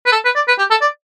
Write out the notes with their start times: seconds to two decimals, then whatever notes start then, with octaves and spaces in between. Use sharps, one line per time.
0.06 B4
0.12 A4
0.25 B4
0.35 D5
0.48 B4
0.59 G4
0.70 A4
0.81 D5